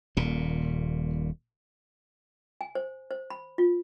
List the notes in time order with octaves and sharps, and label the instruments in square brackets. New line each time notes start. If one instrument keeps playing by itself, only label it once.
[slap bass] D#1 A#2
[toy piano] G#5
C5
C5
B5
F4